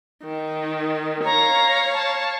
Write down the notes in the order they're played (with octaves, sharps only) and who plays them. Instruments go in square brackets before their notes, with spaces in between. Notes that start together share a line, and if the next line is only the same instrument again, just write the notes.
[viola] D#3
[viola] C#5 F5 [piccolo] A#5
[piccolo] A5